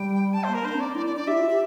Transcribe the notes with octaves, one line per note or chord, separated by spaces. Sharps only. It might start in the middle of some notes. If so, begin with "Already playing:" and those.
Already playing: G3 G5
A5
A#3 C5
A#4
D4 C5
C4
D5
D4
E4 D5
D5
D4 D5
E4 G4 E5
F4
G4